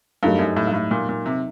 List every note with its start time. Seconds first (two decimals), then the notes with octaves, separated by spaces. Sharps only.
0.23 G2 F#3 A3 D#4 G4 A#4
0.39 F#2
0.56 A2
0.67 G2
0.74 A2
0.91 A#2
1.09 A#2
1.26 C3